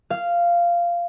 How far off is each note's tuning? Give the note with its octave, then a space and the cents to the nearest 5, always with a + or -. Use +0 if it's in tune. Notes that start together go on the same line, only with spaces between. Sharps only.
F5 -10